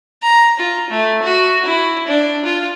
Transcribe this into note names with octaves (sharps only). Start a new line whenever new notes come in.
A#5
F4
A3
F#4
E4
D4
F4